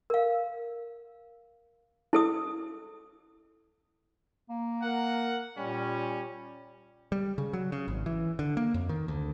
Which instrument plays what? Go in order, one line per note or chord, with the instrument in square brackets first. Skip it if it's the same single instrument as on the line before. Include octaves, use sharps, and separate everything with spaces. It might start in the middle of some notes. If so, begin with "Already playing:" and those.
[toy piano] A#4 F5
E4 A4 D#6
[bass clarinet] A#3
[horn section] A#4 F#5
[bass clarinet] A#2 [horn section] G3 C#4
[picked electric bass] G3
C#3
F#3
C#3
G#1
E3
D3
A#3
F2
D#3
D2